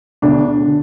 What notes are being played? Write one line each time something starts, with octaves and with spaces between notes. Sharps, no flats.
E1 D2 D3 D4
D3